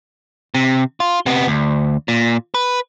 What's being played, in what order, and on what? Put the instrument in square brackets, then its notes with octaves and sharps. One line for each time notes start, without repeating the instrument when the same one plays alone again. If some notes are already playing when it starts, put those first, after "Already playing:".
[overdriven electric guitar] C3
F4
C3 B3
D2
A#2
B4